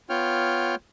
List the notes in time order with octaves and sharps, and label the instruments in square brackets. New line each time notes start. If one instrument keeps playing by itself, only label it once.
[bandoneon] B3 F4 C#5 G5 F6